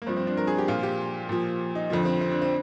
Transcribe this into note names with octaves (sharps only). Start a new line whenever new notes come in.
A#3
G2 F3 C4
C4
D4
A#4
G#4
G4
A#2 F3 F4
G4
A#2 F3
D#4
F2 D3 F3
C4
C4
D4
C4